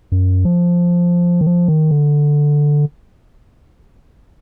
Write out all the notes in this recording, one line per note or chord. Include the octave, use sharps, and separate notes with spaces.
F#2
F3
D#3
F3
D#3
D3